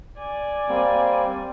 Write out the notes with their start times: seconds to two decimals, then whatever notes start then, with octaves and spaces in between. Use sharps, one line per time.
0.18 D5 G#5
0.69 G3 A#3 C4